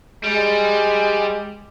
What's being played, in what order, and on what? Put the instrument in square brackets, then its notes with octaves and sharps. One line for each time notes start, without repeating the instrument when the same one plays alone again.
[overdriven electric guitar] G3 [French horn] G#3